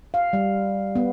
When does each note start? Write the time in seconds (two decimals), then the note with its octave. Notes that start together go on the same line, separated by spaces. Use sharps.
0.14 F5
0.33 G3
0.95 B3